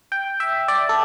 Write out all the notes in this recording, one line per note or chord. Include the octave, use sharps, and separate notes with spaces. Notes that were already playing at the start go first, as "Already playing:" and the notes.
G5
E5
D5
A4